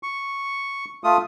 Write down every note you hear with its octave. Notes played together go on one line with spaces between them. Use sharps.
C#6
A3 F4 D#6